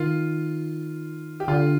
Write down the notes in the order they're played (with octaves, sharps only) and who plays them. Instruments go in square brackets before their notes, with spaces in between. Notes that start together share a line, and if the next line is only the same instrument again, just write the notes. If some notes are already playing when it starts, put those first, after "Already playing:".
Already playing: [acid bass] D#3 [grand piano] F4
[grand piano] G4
[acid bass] D3 [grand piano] F4